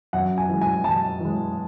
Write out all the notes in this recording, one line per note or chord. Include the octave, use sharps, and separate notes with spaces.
F#2 F#5
G#5
E3 G#3
G#5
F#2 A5
E3 G#3